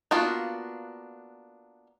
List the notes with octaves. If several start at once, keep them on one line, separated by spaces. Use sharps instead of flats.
A#3 B3 D4 F4 F#4